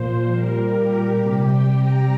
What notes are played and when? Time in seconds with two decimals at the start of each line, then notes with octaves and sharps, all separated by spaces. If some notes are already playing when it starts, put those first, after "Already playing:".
Already playing: A#2 F3 C5
0.29 A#2 G3 A#4
0.73 G4
1.18 C3 G3 G4
1.48 G5
1.78 A#5